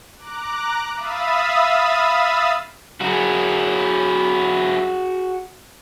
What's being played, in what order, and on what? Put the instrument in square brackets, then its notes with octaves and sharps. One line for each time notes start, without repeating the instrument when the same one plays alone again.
[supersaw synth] A#5 D6 F#6
E5 F5 B5 D#6 E6 A6
[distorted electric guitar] F#3 E4 [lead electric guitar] F#4 G#4